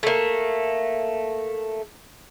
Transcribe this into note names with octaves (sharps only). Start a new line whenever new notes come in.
A3 A#3